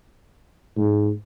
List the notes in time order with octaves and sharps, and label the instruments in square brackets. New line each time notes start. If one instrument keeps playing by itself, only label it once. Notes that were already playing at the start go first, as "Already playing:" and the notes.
[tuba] G#2